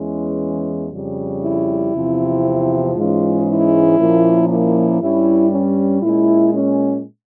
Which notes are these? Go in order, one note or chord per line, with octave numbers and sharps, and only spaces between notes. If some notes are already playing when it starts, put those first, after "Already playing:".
Already playing: E2 E3 G#3 C#4
F2 C#3 G3
E4
E2 C3 F3 C4
G#2 E3 G#3 C#4 F4
E4
A#2 F3 A#3 C#4
E4
G2 G3 C#4 E4
C#4
A#2 G#3 C#4 E4
C#4